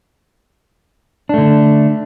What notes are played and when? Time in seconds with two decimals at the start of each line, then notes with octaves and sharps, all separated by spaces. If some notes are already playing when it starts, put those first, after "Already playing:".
1.29 D4
1.34 A3
1.38 D3